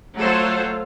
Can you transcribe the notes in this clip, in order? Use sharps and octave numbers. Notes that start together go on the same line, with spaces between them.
F#3 A3 F4 A4 C5